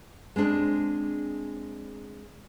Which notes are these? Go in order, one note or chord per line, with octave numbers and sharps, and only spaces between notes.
G#3 C4 D4 G#4